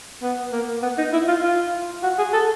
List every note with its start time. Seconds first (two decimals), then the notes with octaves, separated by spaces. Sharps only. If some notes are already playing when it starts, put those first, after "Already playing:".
0.23 B3
0.52 A#3
0.82 B3
0.98 D#4
1.13 E4
1.28 F4
1.43 F4
2.03 F#4
2.18 G#4
2.33 A4